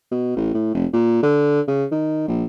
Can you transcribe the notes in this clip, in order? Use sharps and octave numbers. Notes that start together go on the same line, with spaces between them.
B2
A1
A2
F1
A#2
D3
C#3
D#3
A#1